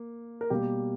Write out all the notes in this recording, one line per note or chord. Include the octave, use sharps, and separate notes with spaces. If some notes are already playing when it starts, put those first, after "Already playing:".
Already playing: A#3
A#4
B2 G3 A#3 G4